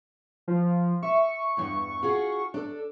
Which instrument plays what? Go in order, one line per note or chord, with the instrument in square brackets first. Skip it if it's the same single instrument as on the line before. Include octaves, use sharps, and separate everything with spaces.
[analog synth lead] F3
[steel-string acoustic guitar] E5 [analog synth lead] C#6
[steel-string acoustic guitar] E2 G2 E3
F4 F#4 G#4
D4 A4